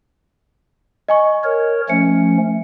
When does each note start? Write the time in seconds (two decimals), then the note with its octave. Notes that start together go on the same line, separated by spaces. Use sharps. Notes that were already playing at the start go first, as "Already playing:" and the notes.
1.08 D#5 G#5 C#6
1.44 A#4 C#5
1.90 F3 A3 C#4 C#7